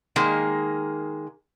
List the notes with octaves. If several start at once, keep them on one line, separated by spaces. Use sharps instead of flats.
D#3 G#3 A#3